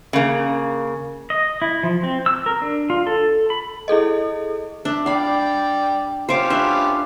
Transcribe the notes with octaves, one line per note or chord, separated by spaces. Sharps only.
C#3 A#3
D#5
E4
F3
C4
E6
A#4
D4
F4
A4
B5
E4 G#4 A4 D#5
D4 E5
D5 F5 G5 B5
C#4 F4 G4 C5 C#6 D6
D4 B4 E5